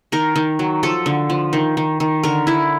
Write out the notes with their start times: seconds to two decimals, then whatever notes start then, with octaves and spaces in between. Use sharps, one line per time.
0.12 D#3 A#4
0.36 D#3
0.59 F#3
0.83 F3 A4
1.06 D3
1.30 F3
1.53 D#3
1.77 D#3
2.00 D#3
2.24 D3 A#4
2.47 D3 E4